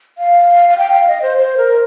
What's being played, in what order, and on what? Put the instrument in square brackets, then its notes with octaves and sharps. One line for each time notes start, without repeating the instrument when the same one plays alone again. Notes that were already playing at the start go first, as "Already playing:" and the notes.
[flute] F5
F5
G5
F5
D#5
C5
C5
A#4